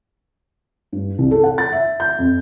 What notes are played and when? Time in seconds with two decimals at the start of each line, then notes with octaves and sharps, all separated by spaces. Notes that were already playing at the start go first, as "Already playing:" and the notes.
0.93 G2
1.18 C2
1.31 A4
1.44 F#5
1.58 A6
1.72 E5
2.00 G6
2.18 F2